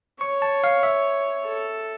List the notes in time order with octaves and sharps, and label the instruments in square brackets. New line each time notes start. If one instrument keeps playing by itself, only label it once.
[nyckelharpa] C#5 [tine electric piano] C#6
[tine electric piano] A5
F5
E5
[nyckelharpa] A4